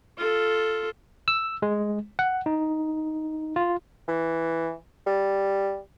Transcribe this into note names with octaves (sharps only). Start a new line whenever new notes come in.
F4 A4
E6
G#3
F#5
D#4
F4
E3
G3